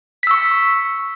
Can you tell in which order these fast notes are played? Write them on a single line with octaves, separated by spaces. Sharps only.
B6 E6 C#6